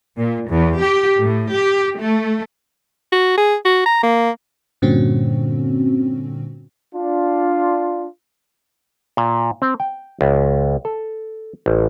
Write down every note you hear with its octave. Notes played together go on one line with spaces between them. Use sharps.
A#2
E2
G4
A2
G4
A3
F#4
G#4
F#4
A#5
A#3
G2 A#2 D3 C4 C#4 F#4
D4 F4
A#2
C4
G5
C#2
A4
A1